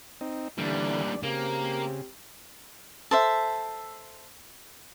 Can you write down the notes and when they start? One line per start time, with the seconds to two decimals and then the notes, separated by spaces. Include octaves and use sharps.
0.21 C4 D#4
0.58 A#2 D3 E3 G3 A3 D4 D5
1.23 C#3 A#3 C4 G4
3.11 A4 C5 E5